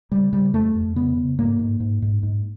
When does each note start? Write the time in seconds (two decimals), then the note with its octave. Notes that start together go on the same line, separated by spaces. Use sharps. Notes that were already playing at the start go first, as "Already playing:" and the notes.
0.12 C#3 G3
0.33 C#3 G3
0.53 F2 A3
0.75 F2
0.96 C#3 B3
1.17 C#3
1.38 G#2 A#3
1.59 G#2
1.80 G#2
2.02 G#2
2.23 G#2